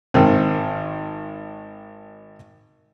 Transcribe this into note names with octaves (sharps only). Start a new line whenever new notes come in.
G#1 D#3 C4